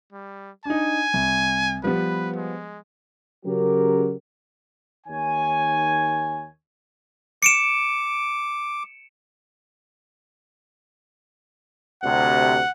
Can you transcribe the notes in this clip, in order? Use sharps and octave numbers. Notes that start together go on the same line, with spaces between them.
G3
D4 D#4 G#5
C2
F3 G3 B3 B4
G#3
C#3 F#3 G4 A#4
D#2 D#3 C#5 G#5
D6 C#7 D7 E7
D2 C3 F#5